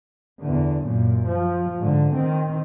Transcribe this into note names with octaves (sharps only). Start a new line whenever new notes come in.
E2 D3
F#2 A#2
F3
G#2 D3
D#3 C4